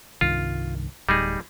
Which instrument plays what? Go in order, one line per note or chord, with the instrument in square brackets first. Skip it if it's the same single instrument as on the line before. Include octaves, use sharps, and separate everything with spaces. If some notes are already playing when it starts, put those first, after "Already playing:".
[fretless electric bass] C2 G2 D#3 [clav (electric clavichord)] F4
[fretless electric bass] D1 [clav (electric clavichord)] G3 D#4 G#4